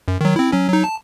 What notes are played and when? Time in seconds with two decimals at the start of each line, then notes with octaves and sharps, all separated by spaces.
0.08 F#2
0.21 D#3 F#3
0.36 C4 E4
0.52 F#3 C#4
0.69 F#3 D#4
0.84 A5